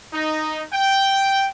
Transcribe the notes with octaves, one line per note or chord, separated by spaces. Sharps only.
D#4
G5